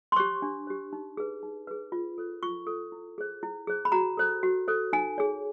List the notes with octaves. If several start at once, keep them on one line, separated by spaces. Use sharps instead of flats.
C6
G4 C5 C#6
D4
G4 C5
D#4
G#4 B4
D#4
G#4 B4
F4
A4 C5
F4 C#6
A4 C5
E4
G#4 C5
E4
G#4 C5
B5
F#4 A#5
A4 C5
F#4
A4 C5
D#4 G#5
G#4 C#5